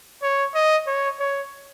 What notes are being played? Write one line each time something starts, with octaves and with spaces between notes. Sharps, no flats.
C#5
D#5
C#5
C#5